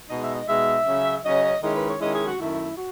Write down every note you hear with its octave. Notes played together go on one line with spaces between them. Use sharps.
B2 G#3 D#4 D#5
E5
D#5
B2 G#3 D#4 E5
C#3 F#3 C#4
C#3 F#3 C#4 D#5
D#3 G#3 C#4 E4 D#5
B4
C#5
D#3 G#3 C#4 E4 D#5
G#4
F#4
F#2 D#3 A3 E4
F#4